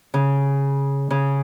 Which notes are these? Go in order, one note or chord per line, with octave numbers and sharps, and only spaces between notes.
C#3
C#3